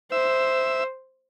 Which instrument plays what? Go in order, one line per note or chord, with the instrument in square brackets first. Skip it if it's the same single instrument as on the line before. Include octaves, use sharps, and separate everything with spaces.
[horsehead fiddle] C5 [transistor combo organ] E5